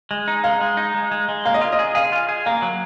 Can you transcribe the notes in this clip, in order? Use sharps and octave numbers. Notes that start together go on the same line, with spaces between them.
G#3
D#4
G#3 F5
G#3
D#4
G#3
G#3
G#3
A#3 F5
D#5
F4
D#5
G#4
G#4 F5
F4
G#4
A#3 F5
F#3